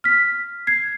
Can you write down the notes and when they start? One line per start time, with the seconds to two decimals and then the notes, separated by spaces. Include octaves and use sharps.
0.04 F6 B6
0.67 G#6 C7